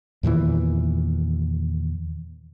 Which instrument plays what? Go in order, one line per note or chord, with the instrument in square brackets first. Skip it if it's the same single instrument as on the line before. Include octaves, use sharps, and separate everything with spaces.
[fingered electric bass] E2 A#2 D#3 E3